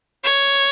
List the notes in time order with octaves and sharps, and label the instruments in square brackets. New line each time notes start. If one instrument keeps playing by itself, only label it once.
[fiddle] C#5